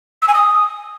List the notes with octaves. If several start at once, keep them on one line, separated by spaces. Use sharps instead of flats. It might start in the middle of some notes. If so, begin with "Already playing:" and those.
E6
G#5
D#6